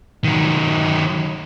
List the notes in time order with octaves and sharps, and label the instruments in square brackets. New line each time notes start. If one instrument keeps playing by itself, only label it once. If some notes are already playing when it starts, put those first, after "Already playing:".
[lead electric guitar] D#3 F#3